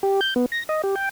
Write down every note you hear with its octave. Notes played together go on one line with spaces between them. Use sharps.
G4
G6
B3
A#6
D#5
G4
G5